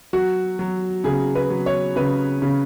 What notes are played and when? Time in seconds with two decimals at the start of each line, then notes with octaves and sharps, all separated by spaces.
0.13 F#3 F#4
0.59 F#3
1.04 C#3 G#4
1.35 B4
1.50 F#3
1.66 C#5
1.96 C#3 B4
2.42 C#3